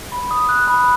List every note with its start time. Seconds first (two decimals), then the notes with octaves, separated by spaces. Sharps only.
0.12 B5
0.31 D#6
0.49 F#6
0.68 B5